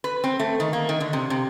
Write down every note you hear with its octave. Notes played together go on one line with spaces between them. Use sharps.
B4
C4
A3
D#3
A#3
D#3
D3
C3
C3